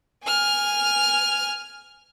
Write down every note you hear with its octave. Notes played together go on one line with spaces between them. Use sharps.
G#5 F6